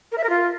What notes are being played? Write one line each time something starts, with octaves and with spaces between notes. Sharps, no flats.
A#4
E5
A#4
F4